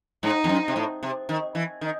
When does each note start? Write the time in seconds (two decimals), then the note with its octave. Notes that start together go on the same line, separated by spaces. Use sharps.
0.23 G#2 D#4
0.44 E2
0.49 F#2
0.68 C3
0.76 A2
1.03 C3
1.29 D#3
1.55 E3
1.81 D#3